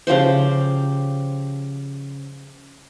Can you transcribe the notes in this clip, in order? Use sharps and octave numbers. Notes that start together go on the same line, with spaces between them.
C#3 F3 G4 C5